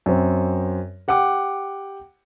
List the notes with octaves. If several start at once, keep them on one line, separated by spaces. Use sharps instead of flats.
F#2 C4
G4 F#5 G5 D6